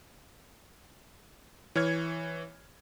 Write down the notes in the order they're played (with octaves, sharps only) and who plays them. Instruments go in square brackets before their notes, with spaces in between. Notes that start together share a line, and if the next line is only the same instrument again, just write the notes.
[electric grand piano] E3 C#5 F6 G#6